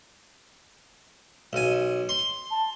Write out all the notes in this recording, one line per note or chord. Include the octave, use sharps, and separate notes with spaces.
B1 G#5
C6
A5